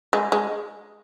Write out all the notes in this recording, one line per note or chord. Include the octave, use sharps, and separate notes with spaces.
G#3
G#3